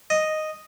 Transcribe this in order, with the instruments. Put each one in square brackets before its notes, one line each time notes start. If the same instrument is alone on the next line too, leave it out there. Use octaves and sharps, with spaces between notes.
[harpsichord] D#5